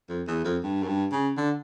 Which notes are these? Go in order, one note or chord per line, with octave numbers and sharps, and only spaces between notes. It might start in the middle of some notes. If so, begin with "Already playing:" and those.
F2
E2
F2
G2
F#2
G2
C#3
D3